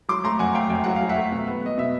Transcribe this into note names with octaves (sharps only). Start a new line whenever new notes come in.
F#3 C6 D6
A3 A#5 C6
F#2 F#5 G#5
A3 F5 G5
F#2 G5
F#3 F#5
F#3 F5
E5 F#5
A3
B2
B3
B3 D#5
B2 E5